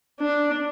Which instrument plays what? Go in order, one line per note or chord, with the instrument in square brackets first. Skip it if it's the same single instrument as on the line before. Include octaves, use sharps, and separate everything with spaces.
[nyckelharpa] D4